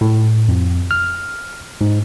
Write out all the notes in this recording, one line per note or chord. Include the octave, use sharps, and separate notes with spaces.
A2
F2
F6
G#2